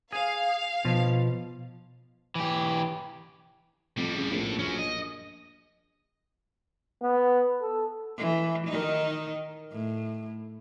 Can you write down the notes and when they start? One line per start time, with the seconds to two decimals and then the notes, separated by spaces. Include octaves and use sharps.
0.13 G#4 F5
0.85 B2 F3
2.35 E3 G4
3.97 F2 A2 G3
4.16 C#3
4.31 A#1 A2
4.59 F#3 C#4
4.79 D#5
7.02 B3
7.62 A4
8.18 E3
8.68 D#3 D#4
9.72 A2